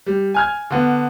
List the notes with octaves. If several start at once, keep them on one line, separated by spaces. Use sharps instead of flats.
G3
G#5 F6 G#6
D3 B3